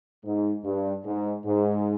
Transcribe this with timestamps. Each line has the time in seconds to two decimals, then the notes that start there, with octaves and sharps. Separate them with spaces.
0.23 G#2
0.64 G2
1.05 G#2
1.45 G#2